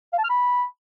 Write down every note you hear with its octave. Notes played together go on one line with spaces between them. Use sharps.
F5
A5
F6
B5